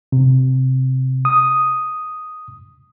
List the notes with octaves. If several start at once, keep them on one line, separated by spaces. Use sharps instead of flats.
C3
D#6